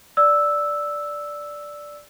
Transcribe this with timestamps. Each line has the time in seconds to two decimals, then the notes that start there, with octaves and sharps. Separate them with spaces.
0.17 D5 E6